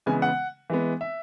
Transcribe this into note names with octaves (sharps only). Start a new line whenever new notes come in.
C#3 E3 G#3 B3 G#5
F#5
E3 G#3 B3
E5